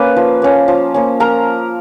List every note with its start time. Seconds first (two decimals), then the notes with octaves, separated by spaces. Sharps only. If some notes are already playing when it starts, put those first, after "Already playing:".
Already playing: A#3 C#4 B4 B5
0.16 F3
0.42 A#3 C#4
0.68 F3
0.94 A#3 C#4
1.20 F3 A#4 A#5